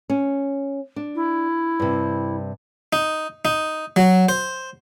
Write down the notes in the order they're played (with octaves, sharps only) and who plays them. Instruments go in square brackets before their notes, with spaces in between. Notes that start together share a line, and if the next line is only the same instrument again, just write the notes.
[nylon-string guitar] C#4
D4
[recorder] E4
[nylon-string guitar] G2 C3
[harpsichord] D#4
D#4
F#3
C5